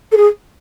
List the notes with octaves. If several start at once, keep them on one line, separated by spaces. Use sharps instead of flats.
A4
G#4